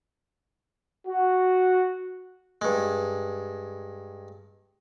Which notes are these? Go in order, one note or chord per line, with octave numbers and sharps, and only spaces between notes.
F#4
G2 G#3